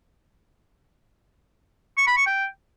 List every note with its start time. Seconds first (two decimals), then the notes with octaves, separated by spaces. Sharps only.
1.97 C#6
2.07 B5
2.17 C#6
2.27 G5